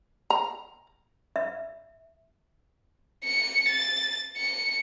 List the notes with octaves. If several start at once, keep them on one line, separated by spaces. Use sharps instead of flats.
A#5
E5
C#7
A6
C#7